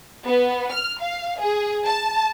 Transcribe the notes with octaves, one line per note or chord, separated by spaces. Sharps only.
B3
F6
F5
G#4
A5